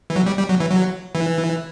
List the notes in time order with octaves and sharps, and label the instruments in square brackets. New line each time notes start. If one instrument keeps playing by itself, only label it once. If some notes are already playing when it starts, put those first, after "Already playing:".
[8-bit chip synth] E3
F#3
G3
G3
F#3
E3
F#3
E3